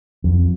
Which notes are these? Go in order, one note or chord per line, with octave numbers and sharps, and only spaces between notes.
F2